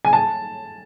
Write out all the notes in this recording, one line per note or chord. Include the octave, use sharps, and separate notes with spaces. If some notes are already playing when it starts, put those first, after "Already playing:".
G#5
A5